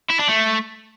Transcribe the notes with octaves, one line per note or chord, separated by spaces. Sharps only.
E4
D4
A3